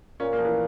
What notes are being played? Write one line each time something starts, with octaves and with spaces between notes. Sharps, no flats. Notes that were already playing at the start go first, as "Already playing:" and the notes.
A#2 C#4
A#3
F3
E3